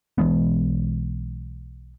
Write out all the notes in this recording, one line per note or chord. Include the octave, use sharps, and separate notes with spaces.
B1 E3 G#3 B3